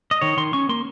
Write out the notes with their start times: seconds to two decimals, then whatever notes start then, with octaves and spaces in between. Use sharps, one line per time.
0.11 D#5
0.21 D#3 C#5
0.37 D#3 C6
0.53 C#4 C#6
0.69 A#3 C6